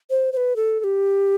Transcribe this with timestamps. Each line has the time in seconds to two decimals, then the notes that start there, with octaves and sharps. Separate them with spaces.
0.10 C5
0.33 C5
0.37 B4
0.56 A4
0.80 A4
0.84 G4